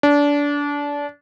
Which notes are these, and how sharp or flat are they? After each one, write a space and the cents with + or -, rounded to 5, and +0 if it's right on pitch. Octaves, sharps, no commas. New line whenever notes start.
D4 -25